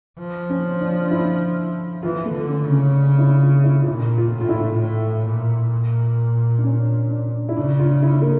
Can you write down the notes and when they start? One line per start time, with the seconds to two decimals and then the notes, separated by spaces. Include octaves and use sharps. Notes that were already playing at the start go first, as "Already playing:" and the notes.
0.19 F3
0.50 C#4
0.80 D4
1.11 E4
2.03 E3 F4
2.25 A3
2.34 D3
2.49 C#4
2.65 C#3
2.72 C#4
2.95 D4
3.19 E4
3.42 F4
3.64 E4
3.83 F4
3.88 A#2 E4
4.18 F4
4.34 A2
4.41 F4
4.49 E4
4.80 A2
5.26 A#2
6.58 D4
6.64 C#4
7.10 D4
7.49 E4
7.56 C#3 D4
7.79 F4
8.02 E4
8.22 A#3